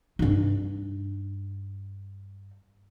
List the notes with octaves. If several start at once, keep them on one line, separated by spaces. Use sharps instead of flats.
G2 D#4